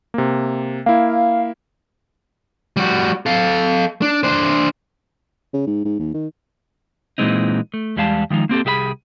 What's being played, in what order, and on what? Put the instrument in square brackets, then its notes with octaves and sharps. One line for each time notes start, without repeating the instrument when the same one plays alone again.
[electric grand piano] C3 A#3
[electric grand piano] A#3 E4 [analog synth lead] F5
[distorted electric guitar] G3 F#4
A4 F5
D4
D4 C5
[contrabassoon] C#3
G#2
G#2
D#2
D#3
[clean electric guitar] A#2 C#3 E3 G#3 C4 D#4
A3
E2 G3 G#3 F5 A5
D#3 F3 G#3 D#4
A#3 C4 G4 A4
C2 G4 G#4 E5 B5